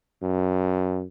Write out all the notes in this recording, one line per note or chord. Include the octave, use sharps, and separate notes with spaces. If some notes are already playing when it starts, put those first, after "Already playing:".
F#2